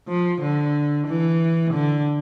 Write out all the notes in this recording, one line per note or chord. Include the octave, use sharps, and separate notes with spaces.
F3
D3
E3
D3